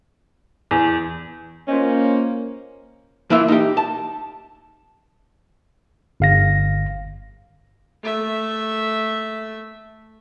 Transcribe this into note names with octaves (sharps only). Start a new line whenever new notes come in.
E2
A#3 C#4 F4 C5 D#5
E3 A#3 E4 F4 E5
D#4 G4
A5
G1 F5 A#6
A3 E5